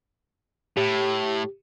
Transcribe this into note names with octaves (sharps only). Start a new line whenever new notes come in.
A2 G4